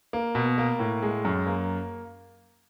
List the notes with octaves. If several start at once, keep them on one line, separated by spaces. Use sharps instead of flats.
A#3
B2
A#3
A2
G#3
F#2
A#3